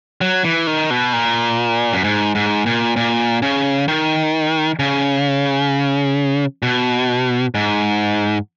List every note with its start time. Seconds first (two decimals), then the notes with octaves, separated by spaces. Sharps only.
0.21 F#3
0.44 E3
0.67 D#3
0.90 B2
1.13 A#2
1.93 F#2
2.04 G#2
2.35 G#2
2.66 A#2
2.96 A#2
3.42 C#3
3.88 D#3
4.79 C#3
6.63 B2
7.55 G#2